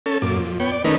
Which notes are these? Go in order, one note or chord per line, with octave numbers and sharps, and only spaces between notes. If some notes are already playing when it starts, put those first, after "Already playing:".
C#4 A4
F#2 A#2 D6
F2
B3 C#5 G5
D5
D#3 A3 C#4 D#4 A#4 B4